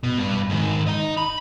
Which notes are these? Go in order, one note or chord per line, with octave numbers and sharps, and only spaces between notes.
B2
G2 G3
G#2 D#3
D#4 D#5
B5